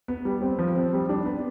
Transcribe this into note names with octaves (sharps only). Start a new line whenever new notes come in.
B3
G3
C4
F3
C4
G3
D4
B3